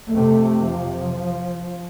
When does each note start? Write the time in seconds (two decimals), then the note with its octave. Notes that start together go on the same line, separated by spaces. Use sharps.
0.11 F2 C3 A3
0.66 F3